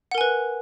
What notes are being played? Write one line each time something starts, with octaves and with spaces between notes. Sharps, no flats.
A#4 B4 F#5 G#5